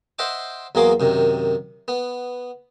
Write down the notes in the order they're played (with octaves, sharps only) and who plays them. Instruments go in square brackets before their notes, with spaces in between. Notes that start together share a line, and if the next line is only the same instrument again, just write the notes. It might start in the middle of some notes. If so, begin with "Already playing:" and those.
[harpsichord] C5 D#5 E5 F#5 D6
E2 F#3 A#3 G#4 C6 D6
F#2 C3 D#3
B3